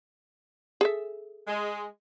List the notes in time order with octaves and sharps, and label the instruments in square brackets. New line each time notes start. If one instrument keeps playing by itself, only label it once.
[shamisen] G#4 A4 E5
[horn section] G#3